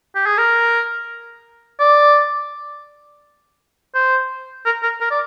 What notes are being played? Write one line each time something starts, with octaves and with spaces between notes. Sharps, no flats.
G4
G#4
A#4
D5
C5
A#4
A#4
A#4
D5